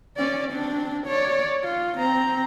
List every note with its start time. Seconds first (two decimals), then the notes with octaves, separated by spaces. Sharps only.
0.17 C#4 D5
0.52 C4 D4
1.07 C#5 D5
1.63 F4
1.98 C4 A#5